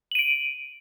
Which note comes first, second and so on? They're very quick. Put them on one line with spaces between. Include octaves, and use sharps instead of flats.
F#7 D#7 D7